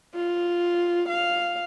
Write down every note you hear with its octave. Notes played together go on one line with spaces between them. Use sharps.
F4
F5